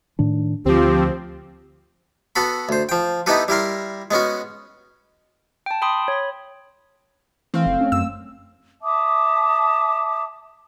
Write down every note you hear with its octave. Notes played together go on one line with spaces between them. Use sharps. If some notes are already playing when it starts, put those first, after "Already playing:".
A2 D#3 D4
D2 F3 C4 G4
B3 F#4 A4 B5
D2 C5
F3 G5
B3 D#4 E4 G4 A4 B4
G3 E4 A#4 C6
G#3 B3 C#4 F#4
G5 A5
G5 B5 C6 D#6
C#5 B5
E3 A3 C4 F5
F#1
C#4
F#2 E6
E5 A5 D6 D#6